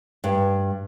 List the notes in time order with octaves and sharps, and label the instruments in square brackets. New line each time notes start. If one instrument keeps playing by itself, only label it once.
[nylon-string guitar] G2